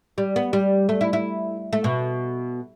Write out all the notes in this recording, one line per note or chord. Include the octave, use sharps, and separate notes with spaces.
G3
B3
G3
A3
E4
E4
A3
B2